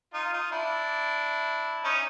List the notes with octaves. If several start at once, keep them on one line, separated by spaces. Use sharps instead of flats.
D#4 F4
D#4 F4
D4 E4
C#4 D#4